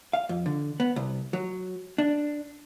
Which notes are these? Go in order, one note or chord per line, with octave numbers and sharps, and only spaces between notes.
F5
F2
D3
B3
C2
F#3
D4